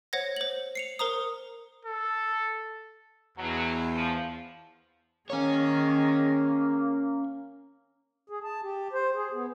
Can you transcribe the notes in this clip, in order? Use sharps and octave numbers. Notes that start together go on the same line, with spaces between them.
C5 C#5 F#5 G#6 A#6
C5 F#7
C7 C#7 F7
A#4 C5 A#5 D#6
A4
E2 B2 F#3
F3
D#3 A#3 C#4 G#4 C#5
G#4
A5
G4
C5
G#4
B3